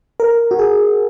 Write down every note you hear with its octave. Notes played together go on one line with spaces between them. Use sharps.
A#4
F#4
G#4